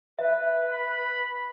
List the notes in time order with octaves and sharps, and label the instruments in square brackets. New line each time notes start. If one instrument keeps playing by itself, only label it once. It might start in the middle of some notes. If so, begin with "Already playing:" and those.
[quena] B4 [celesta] E5
[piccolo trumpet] B5